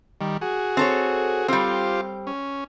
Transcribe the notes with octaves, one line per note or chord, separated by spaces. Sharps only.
D#3 G3
F#4 G#4
C4 A4 C#5
G3 C4 F4 G4 C5
C#4